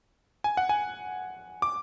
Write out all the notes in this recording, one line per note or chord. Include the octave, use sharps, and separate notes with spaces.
G#5
F#5
G#5
D6